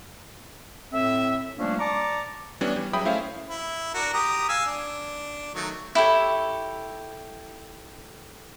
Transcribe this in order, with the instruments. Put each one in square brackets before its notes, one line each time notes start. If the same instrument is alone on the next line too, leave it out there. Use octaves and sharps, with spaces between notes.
[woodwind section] A2 C4 E5
F3 G3 A3 A#3 C#4 D4
D5 A5 A#5 C#6 D6
[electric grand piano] E3 G3 B3 C#4 D4
G3
F#3 G#4 E5 G5 B5 D#6
A3 C#4 E4 C5 E5 F5
[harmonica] E4
D4 F#4 A#4
G4 A#5 D#6
F5 G#5 E6
D4
D#3 F#3 A3
[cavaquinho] E4 G4 A4 C#5